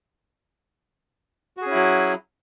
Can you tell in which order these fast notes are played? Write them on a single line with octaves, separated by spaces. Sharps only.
F#4 G#4 C#4 E4 F#3